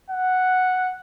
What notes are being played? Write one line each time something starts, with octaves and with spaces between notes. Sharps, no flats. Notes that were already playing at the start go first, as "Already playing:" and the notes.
F#5